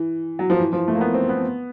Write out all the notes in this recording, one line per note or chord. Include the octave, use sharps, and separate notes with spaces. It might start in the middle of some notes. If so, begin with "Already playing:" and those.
Already playing: E3
F#3
F3
E3
F3
A3
A#3
B3
C4
B3